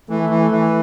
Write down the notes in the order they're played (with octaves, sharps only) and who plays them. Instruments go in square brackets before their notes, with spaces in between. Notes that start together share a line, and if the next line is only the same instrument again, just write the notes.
[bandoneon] E3 [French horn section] A3
[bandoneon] E3
E3